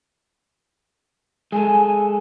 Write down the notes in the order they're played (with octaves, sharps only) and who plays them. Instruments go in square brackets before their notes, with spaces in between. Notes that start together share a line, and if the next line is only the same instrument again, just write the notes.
[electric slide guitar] G#3 A4 [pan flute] G#5